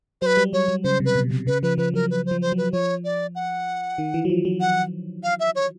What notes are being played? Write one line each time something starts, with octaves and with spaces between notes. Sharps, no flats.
F#3 B4 C5
G3
F#3 C#5
F#3
C#3 C5
C3
B4
B2
C3
C#3 B4
F3 B4
F3 B4
F#3 A#4
B4
C5
F3
C5
F#3
B4
F3 C#5
D5
F#5
D#3
E3
F#3
F3
F#3
F#5
F5
E5
C#5